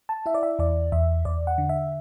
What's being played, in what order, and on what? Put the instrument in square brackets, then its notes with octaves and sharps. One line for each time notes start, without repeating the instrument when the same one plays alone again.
[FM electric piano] A5
E4 E5
D5
E5
E2 D5
E2 E5
E2 D5
F#5
D3
E5